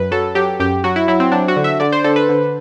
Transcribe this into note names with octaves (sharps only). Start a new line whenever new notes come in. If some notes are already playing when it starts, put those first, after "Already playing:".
Already playing: F#2 B4
F#3 A4
F#3 G4
F#2 G4
F#3 F#4
E4
F#3 E4
C4
F#3 D4
F#4
D3
E5
D3 D5
C5
D3 A4
B4
D3